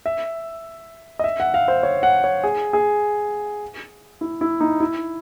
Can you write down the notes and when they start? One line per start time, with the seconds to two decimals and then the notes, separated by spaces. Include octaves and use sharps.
0.06 E5
1.19 D#5
1.24 E5
1.40 F#5
1.54 F5
1.68 C5
1.83 C#5
2.03 F#5
2.24 C#5
2.43 G#4
2.73 G#4
4.21 E4
4.41 E4
4.60 D#4
4.80 E4